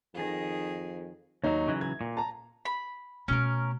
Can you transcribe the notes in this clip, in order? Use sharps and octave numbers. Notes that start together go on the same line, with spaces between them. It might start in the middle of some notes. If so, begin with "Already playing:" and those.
F2 D#3 G#4
D#2 F#3 D#4 C#5
C#3 E3 F#3
G#6
A#2
A5 A#5
B5
B2 A3 C#4 A#4